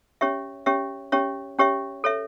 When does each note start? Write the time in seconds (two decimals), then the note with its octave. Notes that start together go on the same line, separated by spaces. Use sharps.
0.21 C#4 G4 C#5 E5
0.66 C#4 G4 C#5 E5
1.12 C#4 G4 C#5 E5
1.58 C#4 G4 C#5 E5
2.04 A4 C#5 E5